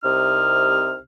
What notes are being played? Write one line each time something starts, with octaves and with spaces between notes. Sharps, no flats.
C2 C3 D#4 F6